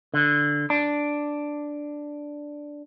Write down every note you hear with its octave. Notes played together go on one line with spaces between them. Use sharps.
D3
D4